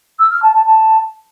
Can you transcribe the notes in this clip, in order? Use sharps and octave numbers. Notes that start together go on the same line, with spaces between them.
E6
F6
A5
A5
A5